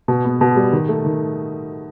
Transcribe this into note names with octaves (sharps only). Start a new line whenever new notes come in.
B2
B3
B2
G3
D#3
A3
D#3